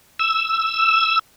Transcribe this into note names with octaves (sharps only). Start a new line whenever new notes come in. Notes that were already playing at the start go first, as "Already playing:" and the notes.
E6